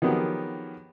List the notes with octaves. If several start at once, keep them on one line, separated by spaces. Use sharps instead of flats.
D#3 F3 F#3 B3 G4 G#4